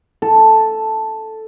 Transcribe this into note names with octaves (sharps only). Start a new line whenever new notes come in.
A4